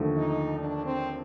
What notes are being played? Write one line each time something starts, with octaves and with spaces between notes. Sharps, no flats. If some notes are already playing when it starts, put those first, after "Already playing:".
Already playing: D#2 D3 F3 A3
D#4
D4
C4